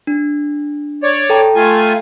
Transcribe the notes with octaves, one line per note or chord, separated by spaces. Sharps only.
D4
C#5 D5
A4 G5 A#5
A3 F4 G#5